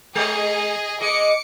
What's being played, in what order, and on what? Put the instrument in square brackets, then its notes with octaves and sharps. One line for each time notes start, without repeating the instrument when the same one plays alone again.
[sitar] G#3 [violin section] G#4 D#5
[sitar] G#3 D#5 [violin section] D6 C#7